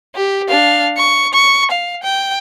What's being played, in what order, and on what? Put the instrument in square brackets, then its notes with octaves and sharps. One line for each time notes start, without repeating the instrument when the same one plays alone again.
[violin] G4
D4 F5
C#6
C#6
F5
G5